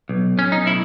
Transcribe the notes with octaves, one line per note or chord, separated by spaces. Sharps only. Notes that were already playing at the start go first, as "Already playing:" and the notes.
B1
B1 C#4
D#4
A2 E4